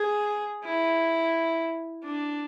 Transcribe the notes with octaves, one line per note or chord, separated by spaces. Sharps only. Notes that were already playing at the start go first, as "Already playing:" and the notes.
Already playing: G#4
E4
D4